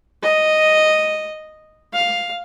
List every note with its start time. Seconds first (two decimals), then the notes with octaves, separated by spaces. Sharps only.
0.22 D#5
1.93 F5